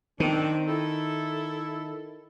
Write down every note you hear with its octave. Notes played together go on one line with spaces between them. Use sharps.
D#3 C4 D4
E4 A4